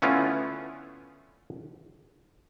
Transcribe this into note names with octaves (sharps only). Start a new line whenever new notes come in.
D3 A3 B3 C#4 E4 F4